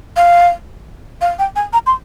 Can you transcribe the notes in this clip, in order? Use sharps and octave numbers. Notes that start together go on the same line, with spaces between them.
F5
F5
G5
G#5
A#5
C6